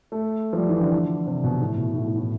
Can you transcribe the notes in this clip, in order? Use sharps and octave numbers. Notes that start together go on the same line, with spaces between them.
A3
F3
G3
E3
D3
C3
B2
A2
B2
A2
A2
A2